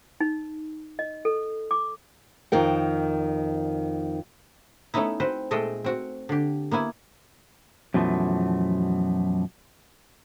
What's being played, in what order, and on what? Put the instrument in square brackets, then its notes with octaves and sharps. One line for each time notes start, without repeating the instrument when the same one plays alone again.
[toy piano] D#4
D#5
A4
D6
[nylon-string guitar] F2 D#3 A#4 G5
[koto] A3 B3 C#4 D#4 E4
C4 F#4 B4 C5
A#2 G#3 A3 A4 D#5 G5
C4 F#4
D3 G4
A#3 B3 E4 G#5
[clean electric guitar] F#2 B2 E3 F3 A3